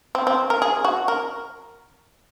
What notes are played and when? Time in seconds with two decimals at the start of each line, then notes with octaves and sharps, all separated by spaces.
0.15 C4
0.27 C4
0.50 A#4
0.62 G#4
0.84 F#4
1.08 A#4